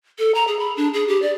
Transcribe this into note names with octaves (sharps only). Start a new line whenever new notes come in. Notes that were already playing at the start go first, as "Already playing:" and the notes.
A4
A#5
G#4
B5
D4
G#4
G4
D5